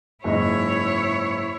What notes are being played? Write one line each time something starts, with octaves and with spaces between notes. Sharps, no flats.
F#1 G#2 E4 C#5 D#5